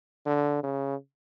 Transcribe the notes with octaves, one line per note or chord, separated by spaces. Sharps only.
D3
C#3